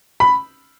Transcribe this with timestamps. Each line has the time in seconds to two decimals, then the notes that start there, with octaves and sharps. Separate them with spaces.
0.20 B5